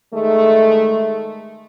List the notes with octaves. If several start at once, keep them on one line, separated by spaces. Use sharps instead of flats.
D#3 G#3 A3